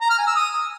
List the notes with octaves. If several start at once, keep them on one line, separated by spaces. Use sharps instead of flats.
A#5
F6
G#5
E6
D#6